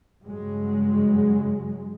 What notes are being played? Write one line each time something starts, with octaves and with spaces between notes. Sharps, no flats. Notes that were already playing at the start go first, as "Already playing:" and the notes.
G2 C#3 F#3 G#3